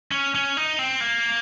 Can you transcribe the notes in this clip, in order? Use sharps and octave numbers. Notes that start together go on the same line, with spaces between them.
C#4
C#4
D#4
C4
A#3